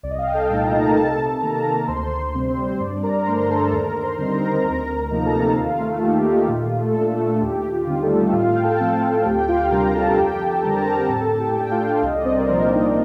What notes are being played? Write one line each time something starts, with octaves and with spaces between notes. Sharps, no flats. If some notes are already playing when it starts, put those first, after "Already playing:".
C2 D5
D#5
F5
G5
A4 A5
A#2 A3 D#4
A#5
A5
A#4 A#5
C3 A4 A5
D#3 A#3 A#4 A#5
D2 C5 C6
C3 G3 C4
C4 C5
C5
G2 D4 D5
A#4 A#5
D3 A3 D4 C5 C6
A#5
A4 A5
D#2 A#4 A#5
C5 C6
D3 G3 C4 D#4
A#4 A#5
D2 A#4 A#5
C3 F3 A#3 D#4
A#5
A4 A5
D#2 F4 F5
A3 A4
D#3 A#3 D#4 G4
G4
A#2 F4
A3 A4
A3 D4
A3 A4
D#2 G4
F4
D3 G3 C4 D#4
A3 A4
A2 F4 F5
G5
A4 A5
F3 A3 C4
F5
D2 G4 G5
G5
F4 F5
C3 G3 D4 A#4 A#5
A4 A5
A5
F2 G4 G5
A4 A5
D3 G3 C4 A#4 A#5
A5
A#4 A#5
A2 A4 A5
G4 G5
A3 D4
G5
F4 F5
G5
F5
C2 D#5
D5
C4 C5
A#4
A#2 F3 A#3 C4 D4 C5
D#4 D#5